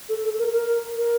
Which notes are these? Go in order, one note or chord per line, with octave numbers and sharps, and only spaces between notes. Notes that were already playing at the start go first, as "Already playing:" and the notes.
A4
A4
A#4
A#4
A#4